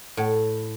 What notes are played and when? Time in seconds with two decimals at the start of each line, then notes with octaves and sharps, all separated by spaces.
0.17 A2